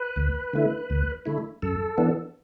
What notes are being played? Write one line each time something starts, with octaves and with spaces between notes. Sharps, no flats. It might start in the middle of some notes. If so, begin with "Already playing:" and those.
Already playing: B4
D2
D3 A3 E4
D2
D3 A3 E4
F#2 A4
E3 B3 D4